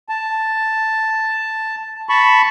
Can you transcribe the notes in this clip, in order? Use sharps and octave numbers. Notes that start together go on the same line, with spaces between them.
A5
A5 B5 C#6